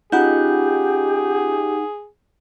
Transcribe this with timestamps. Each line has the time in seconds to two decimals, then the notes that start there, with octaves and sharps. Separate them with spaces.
0.12 C#4 D#4 F4 G4 G#4 F#5 G6